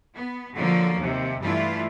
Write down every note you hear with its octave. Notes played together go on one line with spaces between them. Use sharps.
B3
D3 F3 F#3 A#3
D#2 C3
G2 E3 A3 D4 E4 F4